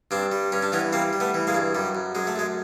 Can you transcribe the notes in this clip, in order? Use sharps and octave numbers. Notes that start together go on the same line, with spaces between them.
G2 C4 D4
G3
G2 C#4
D4
E3 B3 C#4
G3 A#3 C4
G3
A3 B3
E3
G#3 A#3
G2
F#2 G3
F#2
F#2 G#3
A3
F#2 G#3